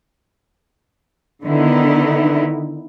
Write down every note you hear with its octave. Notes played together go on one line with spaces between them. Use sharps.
D3 D#3 B3 D#4 E4